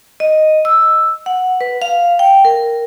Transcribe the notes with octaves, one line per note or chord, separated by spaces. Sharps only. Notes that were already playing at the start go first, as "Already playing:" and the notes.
D#5
E6
F#5
B4
F5
G5
A#4